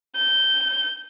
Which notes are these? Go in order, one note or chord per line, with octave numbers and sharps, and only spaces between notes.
G6